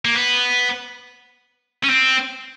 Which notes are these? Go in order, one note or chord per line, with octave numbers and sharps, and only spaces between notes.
A#3
B3
C#4
C4